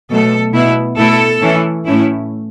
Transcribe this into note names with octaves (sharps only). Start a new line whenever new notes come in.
B2 F#3 A3 A4
B2 B3 E4
B2 A3 E4 A4
E3 C#4 E4
A2 A3 C#4 E4